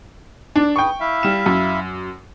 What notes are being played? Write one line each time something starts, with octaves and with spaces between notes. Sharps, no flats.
D4 D5
G#4 B4 G5 C#6
E4 E5 F5
G3 E7
F#2